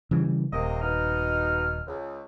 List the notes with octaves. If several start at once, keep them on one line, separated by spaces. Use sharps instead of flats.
C#3 E3 G3
D#1 C3 A#3 D#5
B2 D#4 F6
C#2